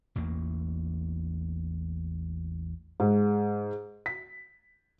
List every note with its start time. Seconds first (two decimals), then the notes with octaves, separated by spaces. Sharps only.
0.16 A1 E2 A#3
3.00 G#2
4.06 B6